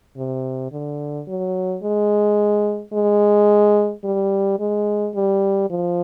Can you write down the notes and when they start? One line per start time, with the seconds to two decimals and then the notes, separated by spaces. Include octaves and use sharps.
0.17 C3
0.72 D3
1.27 F#3
1.83 G#3
2.93 G#3
4.04 G3
4.60 G#3
5.15 G3
5.70 F3